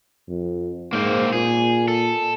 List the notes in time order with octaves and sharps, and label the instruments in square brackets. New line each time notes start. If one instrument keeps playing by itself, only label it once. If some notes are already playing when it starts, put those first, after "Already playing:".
[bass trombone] F2
[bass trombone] G#2 [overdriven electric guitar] A#3 C4
[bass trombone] A#2 [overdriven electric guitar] G#4
[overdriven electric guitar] A4